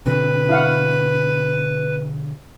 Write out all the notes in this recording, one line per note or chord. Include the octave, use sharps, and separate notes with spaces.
B2 D3 C4 B4
E4 F5 F#5